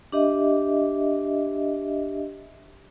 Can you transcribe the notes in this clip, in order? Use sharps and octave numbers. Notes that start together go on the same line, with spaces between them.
D4 G4 D#5 E5